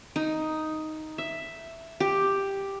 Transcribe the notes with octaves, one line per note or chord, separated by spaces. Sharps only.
D#4
E5
G4